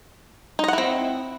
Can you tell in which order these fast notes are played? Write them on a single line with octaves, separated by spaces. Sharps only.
D#4 D#5 F#5 E4 C4